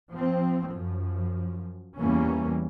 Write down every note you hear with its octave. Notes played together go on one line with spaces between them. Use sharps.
F3 C4
F#2 F3
E2 E3 G3 A#3 C#4